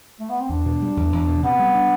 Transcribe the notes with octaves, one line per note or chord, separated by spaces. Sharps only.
A3
B3
C4
E2 D4
B2
G3
E2
E2
B2
C3 B3
G3
D4